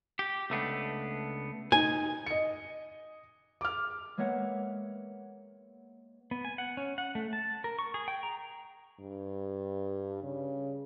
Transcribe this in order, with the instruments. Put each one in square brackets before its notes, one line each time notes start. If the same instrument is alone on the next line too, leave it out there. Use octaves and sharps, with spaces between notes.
[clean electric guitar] G4
C#2 A3 B3 D4
[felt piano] D#4 [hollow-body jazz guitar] G#5
[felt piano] D#5 C#7
D6 F6
[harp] G#3 A#3 B3 C#5 E5 F#5
[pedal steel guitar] B3
G#5
F#5
C#4
F#5
A3
A5
A#4
C#6
G#4
G5
A#5
[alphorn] G2
C#3